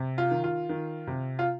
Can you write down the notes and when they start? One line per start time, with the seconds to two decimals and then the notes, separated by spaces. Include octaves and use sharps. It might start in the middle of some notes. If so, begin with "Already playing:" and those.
Already playing: C3
0.18 F4
0.31 D#3
0.44 F4
0.69 D#3
1.07 C3
1.39 F4